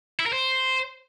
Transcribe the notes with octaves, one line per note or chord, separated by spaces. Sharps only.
E4
A#4
C5